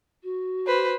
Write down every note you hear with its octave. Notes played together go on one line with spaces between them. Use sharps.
F#4
B4 C5